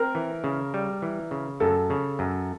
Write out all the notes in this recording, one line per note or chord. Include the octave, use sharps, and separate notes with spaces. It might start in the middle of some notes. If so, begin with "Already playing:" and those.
Already playing: C4 A#4
E3
C#3
G3
E3
C#3
F#2 A4
C#3
F#2